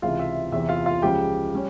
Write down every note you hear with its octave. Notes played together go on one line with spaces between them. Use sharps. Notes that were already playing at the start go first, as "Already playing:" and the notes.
C#2 C3 E3 F4 F5
E5
E2 C3 E3 E5
F4 F5
F4 F5
C#2 C#3 F3 G#3 G4 G5
G3 C#4